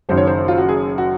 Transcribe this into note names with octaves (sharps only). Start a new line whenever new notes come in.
F#1 F#2 D#3 C5
C#5
C5
F4
F#4
G#4
F#4